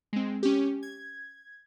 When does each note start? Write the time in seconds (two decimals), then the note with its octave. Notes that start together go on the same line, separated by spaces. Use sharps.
0.13 G#3 C4
0.43 C#4 G4
0.83 G#6